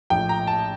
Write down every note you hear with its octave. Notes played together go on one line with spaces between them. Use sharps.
A#1 A2 F3 G5
A#5
A5